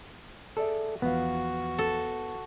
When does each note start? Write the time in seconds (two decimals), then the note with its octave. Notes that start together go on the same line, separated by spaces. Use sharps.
0.57 G#4 A4 D5 E5
1.02 E2 F3 B3 F#4 F5
1.78 A4